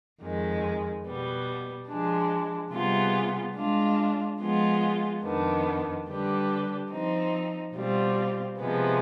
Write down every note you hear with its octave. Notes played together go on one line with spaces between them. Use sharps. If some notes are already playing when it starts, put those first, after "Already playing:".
F2 D#3 G#3
B2 G3 B3
F3 G#3 D4
C3 G3 B3 F4 G#4
G#3 D4 F4
F3 G#3 B3 F4 G#4
F2 D#3 B3 D4
D3 G3 D4 G4 B4
F3 C4 D#4
B2 G3 C4 F4
C3 F3 G#3 B3